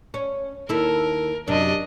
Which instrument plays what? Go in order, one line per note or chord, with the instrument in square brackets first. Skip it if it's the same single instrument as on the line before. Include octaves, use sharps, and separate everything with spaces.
[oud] C#4
[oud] D#2 E4 A4 [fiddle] A#4
[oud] F#2 C3 [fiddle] D4 D#5